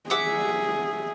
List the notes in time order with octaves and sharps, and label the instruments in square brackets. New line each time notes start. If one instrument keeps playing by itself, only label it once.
[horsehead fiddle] G#4 [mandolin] E5 F#5 D6